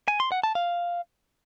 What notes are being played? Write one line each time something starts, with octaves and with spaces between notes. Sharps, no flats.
G#5
C6
F#5
A5
F5